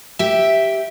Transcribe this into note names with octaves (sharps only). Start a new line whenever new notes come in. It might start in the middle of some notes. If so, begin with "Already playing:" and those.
G4 E5